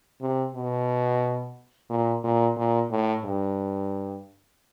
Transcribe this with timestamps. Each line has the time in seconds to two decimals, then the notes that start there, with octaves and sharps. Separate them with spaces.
0.21 C3
0.54 B2
1.90 A#2
2.24 A#2
2.57 A#2
2.91 A2
3.24 G2